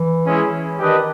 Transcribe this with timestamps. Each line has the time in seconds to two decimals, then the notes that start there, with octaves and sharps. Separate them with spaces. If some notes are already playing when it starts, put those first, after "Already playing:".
Already playing: E3
0.25 G#3 C#4 E4 G#4
0.79 D#3 D4 G4 B4 D#5